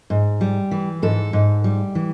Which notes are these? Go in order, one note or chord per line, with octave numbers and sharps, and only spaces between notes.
G#2
G3
E3
G#2 A4
G#2
G3
E3